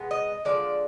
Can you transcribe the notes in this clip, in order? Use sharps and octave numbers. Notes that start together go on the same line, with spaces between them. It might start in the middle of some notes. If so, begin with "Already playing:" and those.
Already playing: B2 G#3 B3
D#5
D3 F3 G#3 D5